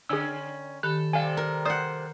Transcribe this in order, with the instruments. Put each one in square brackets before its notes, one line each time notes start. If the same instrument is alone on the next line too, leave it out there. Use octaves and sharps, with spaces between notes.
[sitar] D3 C#4 [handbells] G#4 E6
[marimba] D#3 G4 B5 [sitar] A4 [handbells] F#6
[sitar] C3 G3 A4 [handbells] F5 G#5
[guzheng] A#4
[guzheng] C5 F#5 [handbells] D5 D#6